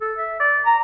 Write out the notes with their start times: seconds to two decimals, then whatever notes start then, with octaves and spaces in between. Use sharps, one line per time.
0.01 A4
0.18 E5
0.40 D5
0.66 A#5